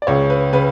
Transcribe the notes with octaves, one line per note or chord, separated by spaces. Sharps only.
D5
C#2 C#3 C#5
B4
C#3 B4